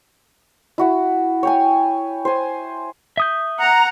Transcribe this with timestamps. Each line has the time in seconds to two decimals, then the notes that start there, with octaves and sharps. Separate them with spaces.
0.78 E4 F#4 F#5
1.43 C#5 G5 G#5
2.25 C5 G#5
3.17 E5 D#6 G6
3.59 F#5 A#5